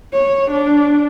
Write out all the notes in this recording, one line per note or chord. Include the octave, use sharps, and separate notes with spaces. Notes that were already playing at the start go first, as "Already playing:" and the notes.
C#5
D4